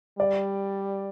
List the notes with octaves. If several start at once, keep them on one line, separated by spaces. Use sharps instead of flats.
G3 D5